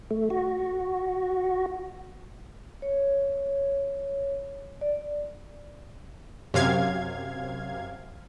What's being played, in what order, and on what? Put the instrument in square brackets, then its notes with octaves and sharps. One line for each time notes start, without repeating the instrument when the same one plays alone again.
[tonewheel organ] A3
F#4
[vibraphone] C#5
D5
[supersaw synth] F#2 C3 F5 G#6